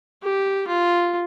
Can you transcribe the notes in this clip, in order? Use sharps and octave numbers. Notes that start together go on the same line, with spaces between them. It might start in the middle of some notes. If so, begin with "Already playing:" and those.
G4
F4